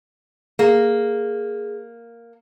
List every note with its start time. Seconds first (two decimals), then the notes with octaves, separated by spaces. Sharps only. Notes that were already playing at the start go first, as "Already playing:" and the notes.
0.59 A#3 G#4